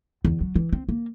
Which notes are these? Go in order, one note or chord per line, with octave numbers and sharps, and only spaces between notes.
E2
F#3
E3
C4
A#3